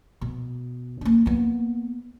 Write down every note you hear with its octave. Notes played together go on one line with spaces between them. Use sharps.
B2
A#3 C#4
A#3 B3